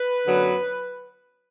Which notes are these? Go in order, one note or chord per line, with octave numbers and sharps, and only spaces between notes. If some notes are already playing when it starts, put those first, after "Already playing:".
Already playing: B4
F#2 D3 F#3 B3